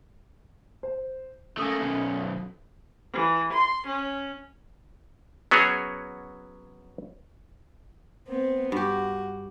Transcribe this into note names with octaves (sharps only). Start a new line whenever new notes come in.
C5
A3 A#3 C#4 A4 D#6
B1 F#2
E3
C6
C#4
F#3 B3 C#4 F#4 G#4 C#5
B3 C4
G2 F#4 G4